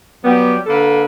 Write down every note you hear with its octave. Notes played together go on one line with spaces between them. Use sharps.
F#3 G3 B3 G4
D3 A#3 A4 B4